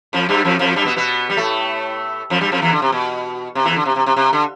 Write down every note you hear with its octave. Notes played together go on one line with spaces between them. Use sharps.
F2 F3
G2 G3
F2 F3
F2 F3
G2 G3
B2 B3
B2 B3
G3
A2 A3
F2 F3
G2 G3
F2 F3
E2 E3
D3
C3
B2
C3
E2 E3
D3
C3
C3
C3
C3
D3